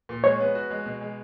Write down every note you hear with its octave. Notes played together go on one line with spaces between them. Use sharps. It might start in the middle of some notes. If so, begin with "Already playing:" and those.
A#2
G#3 C#5
B3
F#4
G#3
B2
G#3